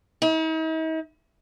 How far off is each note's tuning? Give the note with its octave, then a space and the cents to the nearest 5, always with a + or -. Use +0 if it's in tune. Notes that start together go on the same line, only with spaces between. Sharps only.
D#4 +45